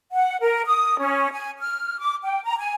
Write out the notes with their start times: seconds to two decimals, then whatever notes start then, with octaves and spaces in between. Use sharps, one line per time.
0.12 F#5
0.41 A#4
0.66 D#6
0.99 C#4
1.32 G#5
1.59 F6
1.99 D6
2.23 G5
2.44 A#5
2.58 G#5